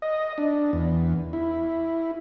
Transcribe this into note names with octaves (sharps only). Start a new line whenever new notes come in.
D#5
D4
E2
E4